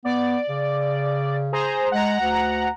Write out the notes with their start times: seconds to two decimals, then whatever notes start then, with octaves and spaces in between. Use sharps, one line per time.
0.05 B3 D5
0.49 C#3
1.52 G#4 C5 A#5
1.92 G#3 F#5 A#5
2.20 D2